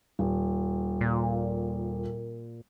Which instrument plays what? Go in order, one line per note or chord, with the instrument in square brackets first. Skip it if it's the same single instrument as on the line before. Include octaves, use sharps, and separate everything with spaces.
[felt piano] D#1
[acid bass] A#2